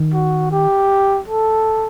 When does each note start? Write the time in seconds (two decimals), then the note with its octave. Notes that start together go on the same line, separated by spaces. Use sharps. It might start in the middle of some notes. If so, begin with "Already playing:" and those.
Already playing: D#3
0.13 F#4
0.51 G4
1.28 A4